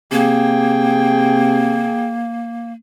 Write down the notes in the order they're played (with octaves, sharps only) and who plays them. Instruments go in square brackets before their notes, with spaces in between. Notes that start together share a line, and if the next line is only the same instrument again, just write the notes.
[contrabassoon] C3 [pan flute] A#3 [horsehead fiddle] G#4 G5